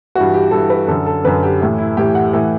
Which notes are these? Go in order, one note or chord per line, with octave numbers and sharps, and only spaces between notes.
G2 E3 F#4
G4
G2 E3 A4
B4
F#2 D3 A4
A4
F#2 D3 B4
G4
A2 E3
E4
A2 E3 G4
F#5
A2 E3